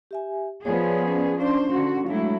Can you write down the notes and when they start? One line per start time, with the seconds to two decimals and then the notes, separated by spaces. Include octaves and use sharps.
0.11 G4 E5 G#5
0.65 F3 B3 G#4 C#5 D5
1.05 C#4 D5
1.40 C#4 D4 C5 F5 C6
1.72 D3 F#4
2.07 F#3 G#3 A3 D4 E4 F5